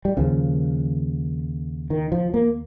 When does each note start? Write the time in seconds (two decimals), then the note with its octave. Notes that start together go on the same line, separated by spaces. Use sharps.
0.05 G3
0.17 D#2 C#3 F3
1.90 D#3
2.12 F3
2.34 A#3